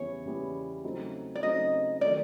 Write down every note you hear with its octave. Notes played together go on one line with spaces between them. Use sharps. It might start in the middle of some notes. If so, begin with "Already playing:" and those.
Already playing: E2 C#3 E3 G3 B3 C#5
E2 C#3 E3 G3 B3
C#3 F#3 A3 C4 D#4
D5
C#3 F#3 A3 C4 D#4 D#5
D#3 F#3 A3 D5